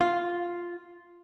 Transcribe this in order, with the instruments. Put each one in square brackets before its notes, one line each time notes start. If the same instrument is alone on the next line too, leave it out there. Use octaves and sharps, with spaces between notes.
[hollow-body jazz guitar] F4